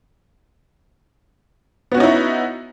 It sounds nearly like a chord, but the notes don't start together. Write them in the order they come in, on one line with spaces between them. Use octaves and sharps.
B3 F#4 C#4 D#4 E4